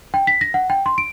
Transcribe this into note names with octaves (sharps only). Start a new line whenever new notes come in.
G5
B6
A#6
F#5
G5
C6
D7